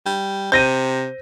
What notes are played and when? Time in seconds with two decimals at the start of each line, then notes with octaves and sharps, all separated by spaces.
0.06 G3
0.52 C3 C5 G6 A#6 D#7